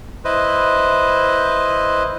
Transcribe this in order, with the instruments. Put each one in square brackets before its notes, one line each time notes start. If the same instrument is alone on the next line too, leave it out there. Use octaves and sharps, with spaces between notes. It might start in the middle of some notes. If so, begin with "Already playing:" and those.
[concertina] E4 B4 C5 D#5